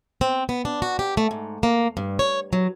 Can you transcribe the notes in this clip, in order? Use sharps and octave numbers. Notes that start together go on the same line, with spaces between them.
C4
B3
D4
F#4
G4
A3
G#2
A#3
G2
C#5
F#3